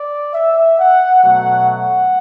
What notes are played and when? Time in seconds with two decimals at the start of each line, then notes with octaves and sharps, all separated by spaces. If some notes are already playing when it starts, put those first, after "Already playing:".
Already playing: D5
0.33 E5
0.78 F#5
1.23 B2 F#3 A3 F#5
1.67 F#5